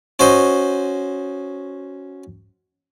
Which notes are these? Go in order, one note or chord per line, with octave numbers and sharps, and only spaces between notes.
C#4 F#4 C5 D#5